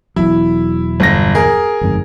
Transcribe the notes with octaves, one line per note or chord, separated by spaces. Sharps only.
E1 E2 F#3 E4
G1 A#6
G#4 A#4
G1 F2 G#2